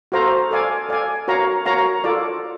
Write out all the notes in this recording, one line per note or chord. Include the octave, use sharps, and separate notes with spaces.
F#4 A4 C5 F5 A#5
A4 D5 F5 G#5
A4 D5 F5 G#5
F#4 A#4 C#5 F5 A#5
F#4 A#4 C#5 F5 A#5
F4 A4 D5